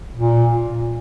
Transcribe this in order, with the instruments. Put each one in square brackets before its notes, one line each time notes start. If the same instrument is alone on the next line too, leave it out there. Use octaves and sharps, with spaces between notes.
[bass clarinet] A#2